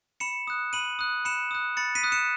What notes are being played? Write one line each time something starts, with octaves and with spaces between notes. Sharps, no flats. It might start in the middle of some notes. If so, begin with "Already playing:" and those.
B5 C#7 E7
D#6 F#6
B5 D#7 F#7
D#6 F#6
B5 C#7 E7
D#6 F#6
B5 A6 C#7
B6 D#7
D#6 F#6
C#7 E7